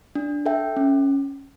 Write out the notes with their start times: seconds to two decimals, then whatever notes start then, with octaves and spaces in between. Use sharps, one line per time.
0.15 D4
0.46 A4 E5 G5
0.77 C#4